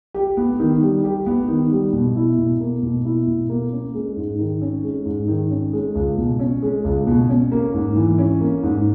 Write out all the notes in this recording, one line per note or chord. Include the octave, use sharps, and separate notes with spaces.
G4
B3
D#3
G3
G4
B3
D#3
G3
B2
E4
B2
A#3
B2
E4
B2
A#3
C#4
G#3
G#2
D#3
C#4
G#3
G#2
D#3
C#4
G#3
C#2
B2
C#4
G#3
C#2
B2
C#4
A#3
G#2
E3
C#4
A#3
G#2